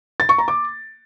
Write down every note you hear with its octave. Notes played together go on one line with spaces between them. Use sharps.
A6
C#6
A#5
D6